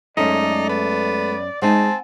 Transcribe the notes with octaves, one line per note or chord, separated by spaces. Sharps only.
F#2 G#3 A3 C#4 D#4 A4 D5
B3
G#3 C4 D#4 F#5 G#5 A5